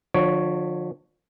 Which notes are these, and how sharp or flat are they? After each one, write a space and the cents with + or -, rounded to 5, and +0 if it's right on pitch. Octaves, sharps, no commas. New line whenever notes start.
D3 +35 F3 +35 C#5 +5